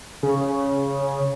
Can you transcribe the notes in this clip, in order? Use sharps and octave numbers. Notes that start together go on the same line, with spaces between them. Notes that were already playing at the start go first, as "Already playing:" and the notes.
C#3